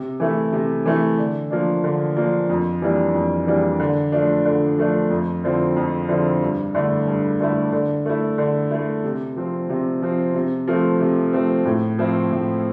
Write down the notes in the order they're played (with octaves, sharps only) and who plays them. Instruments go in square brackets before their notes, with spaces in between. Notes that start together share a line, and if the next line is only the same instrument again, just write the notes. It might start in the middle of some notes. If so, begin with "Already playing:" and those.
Already playing: [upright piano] C3
E3 A3 E4
C3
E3 A3 E4
D3
F3 A#3 D4
D3
F3 A#3 D4
F2
E3 G3 A#3 D4
F2
E3 G3 A#3 D4
D3
F3 A3 D4
D3
F3 A3 D4
F2
D3 F3 C4 E4
F2
D3 F3 C4 E4
G2
D3 A3 E4
G2
D3 A3 E4
D3
A3 E4
D3
A3 E4
C3
F3 C4
C3
F3 C4
C3
F3 A3 C4
C3
F3 A3 C4
A2
F3 C4 E4
A2